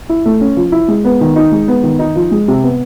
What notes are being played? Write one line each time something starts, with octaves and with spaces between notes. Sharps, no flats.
E4
A3
C#4
F3
E4
G#3
B3
D#3
D#4
G#3
B3
D#3
D#4
F3
G#3
C3
B3